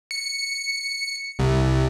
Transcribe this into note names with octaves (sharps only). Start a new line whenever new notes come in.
C#7
C2